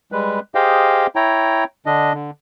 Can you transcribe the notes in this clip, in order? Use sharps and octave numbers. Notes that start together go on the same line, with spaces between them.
G3 G#3 B4
G4 G#4 C5 D#5 F5 G5
E4 C#5 G5 A#5
D3 D4 D#5
D3